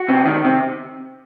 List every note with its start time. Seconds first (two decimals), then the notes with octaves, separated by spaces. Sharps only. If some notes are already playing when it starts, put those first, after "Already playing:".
Already playing: F#4
0.08 C3
0.26 D#3
0.45 C3